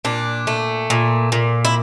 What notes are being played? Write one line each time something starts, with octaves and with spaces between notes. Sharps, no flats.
A#2 D4
A3
A#2
A#2
E4